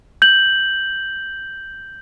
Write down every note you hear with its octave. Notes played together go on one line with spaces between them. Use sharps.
G6 F#7